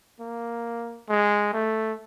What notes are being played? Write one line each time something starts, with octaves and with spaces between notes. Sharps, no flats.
A#3
G#3
A3